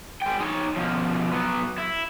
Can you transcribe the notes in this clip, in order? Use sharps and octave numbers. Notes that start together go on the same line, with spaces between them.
G#3 G5
D#4 C#5
B2 F3
F#3 B3
E4